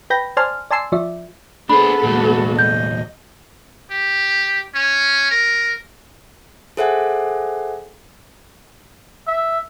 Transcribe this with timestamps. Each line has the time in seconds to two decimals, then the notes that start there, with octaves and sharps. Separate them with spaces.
0.10 B4 G5 B5 G6 A#6
0.37 C5 D5 G#5 A5 C6 F6
0.71 D5 G#5 A5 C6 E6 C7
0.92 F3 F4 D5 E5
1.69 B3 D4 G#4 A4 C5 B5
2.03 E2 A#2 G#3 F#4
2.59 D#5 G6
3.90 G4
4.74 C#4
5.31 A#4
6.77 G#4 A4 C5 E5 F#5 G#5
9.27 E5